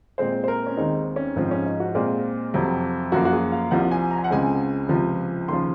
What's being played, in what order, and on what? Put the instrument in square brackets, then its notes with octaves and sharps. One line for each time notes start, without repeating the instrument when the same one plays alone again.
[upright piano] A#2 G#3 C4 C5
C5
A#4
C#4
D#2 D#3 G#3 C4 D#4
C#4
G#2 F3 C4
C#4
D#4
F#4
A#2 G#3 C4 F4
F2 C3 F#3 C4
F#2 F3 A#3 F#4
F#4
G#4
F5
C2 C3 F3 F#5
G#5
A#5
G#5
F#5
C#2 C#3 G#3 C4 G#5
C#2 C3 F3
D#2 C#3 F3 C6